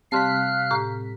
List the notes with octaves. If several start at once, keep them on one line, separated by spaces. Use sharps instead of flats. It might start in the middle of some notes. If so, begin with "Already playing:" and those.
C3 G3 F5 A5 C6 F6 F#6 B6
A2 G4 A#5